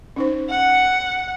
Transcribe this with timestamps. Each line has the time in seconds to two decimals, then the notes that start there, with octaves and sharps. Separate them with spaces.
0.16 C#4 D#4 C5
0.49 F#5